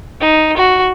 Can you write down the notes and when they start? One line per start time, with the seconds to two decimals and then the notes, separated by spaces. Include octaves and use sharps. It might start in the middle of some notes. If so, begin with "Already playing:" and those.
0.20 D#4
0.57 F#4